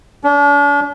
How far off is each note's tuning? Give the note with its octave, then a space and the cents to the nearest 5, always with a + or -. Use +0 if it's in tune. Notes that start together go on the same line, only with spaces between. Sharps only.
D4 -40